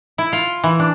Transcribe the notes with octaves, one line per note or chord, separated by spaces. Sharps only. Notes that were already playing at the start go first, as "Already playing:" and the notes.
E4
F4
E3
D4